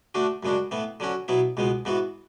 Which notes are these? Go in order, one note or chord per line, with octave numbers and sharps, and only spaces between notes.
D3 A3 D4 F#4
F#2 C#3 G#3 D4 F#4
A2 E3 B3
D3 F#3 C#4 F#4
B2 F#3 B3 E4
C#2 B2 G#3 B3
G#2 E3 B3 F#4